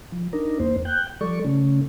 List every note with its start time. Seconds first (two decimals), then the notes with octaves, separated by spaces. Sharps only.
0.12 F3
0.33 D4 D#4 A#4
0.60 E2 A#3 C5
0.85 G5 F#6 G6
1.21 F3 G3 A4 D5 C#6
1.45 C#3 A3 C#4